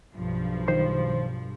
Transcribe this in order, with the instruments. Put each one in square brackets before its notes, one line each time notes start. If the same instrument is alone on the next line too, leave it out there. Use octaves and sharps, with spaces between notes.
[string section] B1 G2 F3
[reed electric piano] D#3 C5 C6